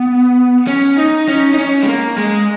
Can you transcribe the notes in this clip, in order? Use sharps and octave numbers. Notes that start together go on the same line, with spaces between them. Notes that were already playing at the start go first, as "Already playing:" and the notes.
Already playing: B3
C#4
D#4
C#4
D#4
C#4
G#3
A#3
G#3